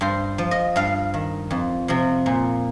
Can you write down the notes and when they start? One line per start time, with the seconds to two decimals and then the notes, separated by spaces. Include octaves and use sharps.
0.01 G2 C5
0.38 F3
0.51 D#5
0.76 G2 F5
1.14 D#3
1.51 F2
1.88 C3 F3
2.26 A#2